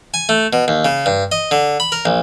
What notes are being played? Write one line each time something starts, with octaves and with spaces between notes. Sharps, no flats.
G#5
A3
B2
D#2
C#3
G2
D#5
D3
B5
A#4
A#1